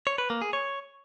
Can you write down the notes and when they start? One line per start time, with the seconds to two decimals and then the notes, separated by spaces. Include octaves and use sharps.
0.07 C#5
0.18 B4
0.30 A#3
0.42 G#4
0.53 C#5